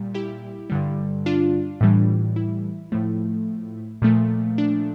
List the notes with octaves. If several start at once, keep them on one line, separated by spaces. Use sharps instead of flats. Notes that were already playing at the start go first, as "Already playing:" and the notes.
Already playing: A#2 G3
E4 G4
G2 D3 G3
D4 F4
A2 E3 G3
E4
A2 F3 A3
A#2 F3 A3
D4